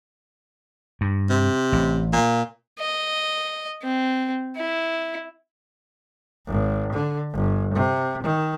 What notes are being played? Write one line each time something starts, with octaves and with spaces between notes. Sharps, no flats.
G2
C3
A1
A#2
D#5
C4
E4
G#1
D3
G1
C3
D#3